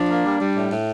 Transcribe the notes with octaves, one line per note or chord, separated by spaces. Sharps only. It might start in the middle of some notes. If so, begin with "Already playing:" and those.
Already playing: F3 D4
A#3
G3
G3
A2
A2